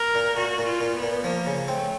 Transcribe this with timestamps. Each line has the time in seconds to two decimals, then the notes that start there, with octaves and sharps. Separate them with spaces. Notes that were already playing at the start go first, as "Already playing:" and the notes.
Already playing: A#4
0.15 A#2
0.37 A#2 F#4
0.58 A#2
0.66 F4
0.81 A#2
0.96 B3
1.03 A#2
1.24 F3 A#3
1.47 C#3
1.68 A3 C4